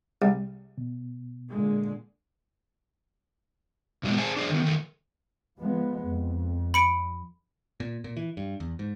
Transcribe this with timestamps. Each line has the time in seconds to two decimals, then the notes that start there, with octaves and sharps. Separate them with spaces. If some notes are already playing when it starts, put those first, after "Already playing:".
0.22 C2
0.78 B2
1.49 A#2 D3 G#3
4.03 A#2 E3 F#3 G#3 B3
4.18 G#4 C5 F5 G#5 A5
4.36 D4 G#4 C5
4.50 D#3 B3
4.62 D#3 A3
5.59 F3 G#3 B3
6.05 F2
6.74 B5 C#7 D7
7.80 A#2
8.04 A#2
8.17 E3
8.37 G2
8.60 E2
8.79 G#2